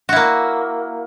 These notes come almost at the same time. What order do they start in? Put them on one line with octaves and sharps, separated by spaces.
F#4 E4 A#3